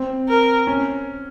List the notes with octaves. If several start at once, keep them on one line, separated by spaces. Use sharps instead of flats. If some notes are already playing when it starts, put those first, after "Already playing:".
Already playing: C4
A#4
C#4